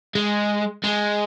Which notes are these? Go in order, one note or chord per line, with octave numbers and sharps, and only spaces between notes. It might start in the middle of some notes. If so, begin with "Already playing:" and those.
G#3
G#3